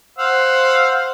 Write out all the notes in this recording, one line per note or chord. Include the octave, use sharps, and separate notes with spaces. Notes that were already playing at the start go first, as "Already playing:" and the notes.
C5 F5 F#5 E6